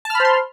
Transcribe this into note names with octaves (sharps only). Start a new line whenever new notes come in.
C5 A5 B5 C6 F6